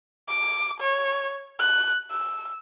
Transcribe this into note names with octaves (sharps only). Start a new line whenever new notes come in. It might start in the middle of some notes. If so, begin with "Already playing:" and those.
D6
C#5
F#6
E6